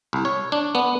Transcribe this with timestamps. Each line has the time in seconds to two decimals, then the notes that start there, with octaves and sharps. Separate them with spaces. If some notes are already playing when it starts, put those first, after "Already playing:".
0.13 C2
0.25 C#5
0.52 D4
0.75 B3